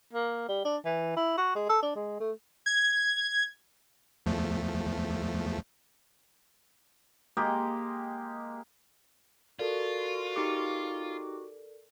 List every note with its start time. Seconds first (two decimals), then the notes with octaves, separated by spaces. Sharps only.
0.13 A#3
0.48 G3
0.65 D4
0.85 E3
1.17 E4
1.38 F#4
1.55 G#3
1.69 A4
1.83 D4
1.96 G#3
2.20 A3
2.66 G#6
4.26 E2 F3 A3
7.37 G#3 A#3 G4 D#5
9.59 F4 F#4 A4 A#4 D5
10.36 D#4 G4 D6